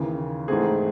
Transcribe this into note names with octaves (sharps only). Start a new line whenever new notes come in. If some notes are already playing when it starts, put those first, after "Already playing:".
Already playing: D#2 C#3 E3
G#2 E3 A3 C4 G#4